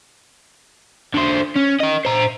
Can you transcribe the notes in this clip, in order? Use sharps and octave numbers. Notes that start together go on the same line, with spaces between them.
D3 C5
C#4
A#4 D#5
C5 A#5